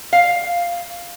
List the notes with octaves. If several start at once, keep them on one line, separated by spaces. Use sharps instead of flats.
F5